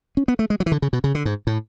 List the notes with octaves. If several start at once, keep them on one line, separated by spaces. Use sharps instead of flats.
C#4
B3
A3
G#3
F#3
E3
D3
C#3
B2
C#3
D3
G#2
A2